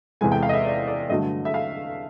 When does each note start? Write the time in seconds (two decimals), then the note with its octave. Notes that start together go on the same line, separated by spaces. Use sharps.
0.21 E2 C3 E3 G#3 G#5
0.32 G5
0.43 F5
0.49 D#5
0.53 E5
0.65 D5
0.87 D5
1.09 G2 D3 F#3 A3 D#5
1.45 E5
1.54 F5